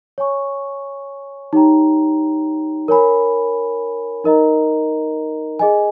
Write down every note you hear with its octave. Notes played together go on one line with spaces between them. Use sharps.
C#5 G#5 C#6
D#4 G4 C#5 G5 A#5
A#4 C#5 G#5 B5
D#4 A#4 D#5 A#5
G#4 D#5 G#5